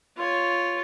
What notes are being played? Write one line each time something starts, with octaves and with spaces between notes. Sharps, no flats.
F4 C#5